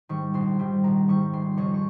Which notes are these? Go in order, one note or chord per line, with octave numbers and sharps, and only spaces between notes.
G#2 D#3 G3 C#6
A#1 C6
G#2 D#3 G3
A#1 A#5
G#2 D#3 G3 C#6
F1 C6
F2 C#3 C#6
C#6